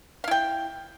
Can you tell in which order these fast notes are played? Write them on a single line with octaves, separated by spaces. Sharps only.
F5 E4 G5